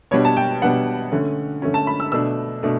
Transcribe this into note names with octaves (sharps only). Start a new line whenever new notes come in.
B2 G3 B3 D4 C#5
A5
G5
B2 G3 B3 D4 F#5
D3 A3 C#4
D3 A3 C#4
A5
B5
E6
B2 A3 D4 E6
B2 A3 D4